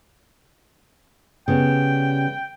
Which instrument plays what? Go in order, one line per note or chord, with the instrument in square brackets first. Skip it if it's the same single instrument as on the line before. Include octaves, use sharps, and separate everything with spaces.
[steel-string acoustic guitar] C#3 G3 B3 [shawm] G5